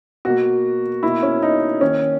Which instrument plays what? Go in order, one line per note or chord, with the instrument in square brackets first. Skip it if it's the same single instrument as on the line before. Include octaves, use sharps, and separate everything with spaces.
[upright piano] B2 A#3 F#4
B2 A#3 E4
C#4
D#4
D#3 A#3 C#4